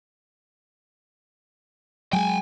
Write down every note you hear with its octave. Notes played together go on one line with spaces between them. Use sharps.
F#3 G#3 G5 G#5